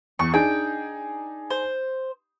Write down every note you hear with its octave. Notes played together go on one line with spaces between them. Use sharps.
E2 C#6
D4 D#4 G#4 G5
C5